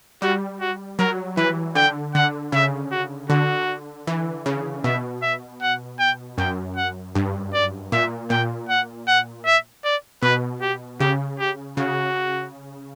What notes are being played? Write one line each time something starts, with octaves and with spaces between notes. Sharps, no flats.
G3 F#4
F#4
F#3 A#4
E3 B4
D3 G5
D3 F#5
C#3 E5
F#4
D3 F#4
E3
C#3
B2 E5
E5
F#5
G5
F#2 G5
F#5
G2
D5
A#2 E5
A#2 G5
F#5
F#5
E5
D5
B2 B4
G4
C#3 G4
G4
C#3 F#4